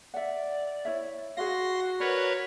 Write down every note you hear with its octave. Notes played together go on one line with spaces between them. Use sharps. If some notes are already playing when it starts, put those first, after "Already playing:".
D5 E5 F#5
E4 C#5 E5
F#4 G#4 F5 C6 A#6
A#4 B4 C#5 D5